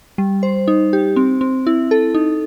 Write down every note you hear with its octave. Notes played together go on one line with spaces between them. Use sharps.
G3
C5
D#4
G4
C4
C4
E4
A4
D#4